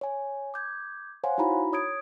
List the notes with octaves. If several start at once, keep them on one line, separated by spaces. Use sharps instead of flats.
C#5 G#5
D6 G6 G#6
C5 C#5 F5 F#5 G#5 C6
D#4 E4 F#4 A#5 B5
C#5 D#6 G#6 D7